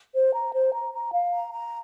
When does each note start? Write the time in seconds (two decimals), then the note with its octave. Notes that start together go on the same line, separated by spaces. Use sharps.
0.14 C5
0.33 A#5
0.53 C5
0.73 A#5
0.93 A#5
1.13 F5
1.33 A#5
1.53 A#5